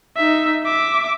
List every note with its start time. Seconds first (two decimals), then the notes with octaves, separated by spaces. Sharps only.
0.16 D#4 E5
0.63 E5 D6